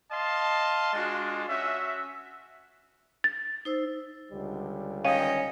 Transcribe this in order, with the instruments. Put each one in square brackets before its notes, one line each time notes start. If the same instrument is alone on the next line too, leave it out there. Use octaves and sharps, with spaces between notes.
[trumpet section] D#5 F5 A5 C6
G#3 D4 F4 F#4
C#4 F#4 E5
[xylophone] A6
[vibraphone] D#4 C5 E6
[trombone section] C#2 D3 G3
[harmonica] D#3 D#5 G5 [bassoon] C#4 [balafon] F5